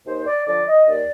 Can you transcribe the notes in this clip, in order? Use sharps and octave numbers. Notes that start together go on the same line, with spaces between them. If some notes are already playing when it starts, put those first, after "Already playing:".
D#2 C5
D5
D3 F3 D5
D#5
D#2 D5